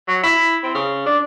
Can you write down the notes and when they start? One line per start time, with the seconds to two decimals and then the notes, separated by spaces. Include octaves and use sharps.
0.08 F#3
0.23 E4
0.63 C4
0.75 C#3
1.06 D4